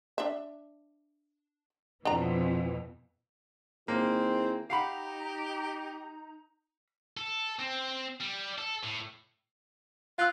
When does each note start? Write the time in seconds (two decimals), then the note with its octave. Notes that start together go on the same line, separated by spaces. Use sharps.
0.18 D4 E5
2.05 F2 B2 E3 D4 A#5
3.88 D#3 A#3 C4 E4 G#4
4.70 D#4 G4 F5 F#5 A#5 B5
7.17 A4
7.59 C4
8.21 G3
8.58 A4
8.84 A2
10.18 F4 F5 E6 F#6